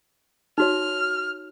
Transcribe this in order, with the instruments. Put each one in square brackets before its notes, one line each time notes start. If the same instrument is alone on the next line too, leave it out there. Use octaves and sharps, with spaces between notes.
[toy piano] D#4 F#4 C#5 [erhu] F6